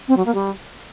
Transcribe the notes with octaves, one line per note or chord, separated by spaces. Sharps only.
C4
F#3
A#3
G3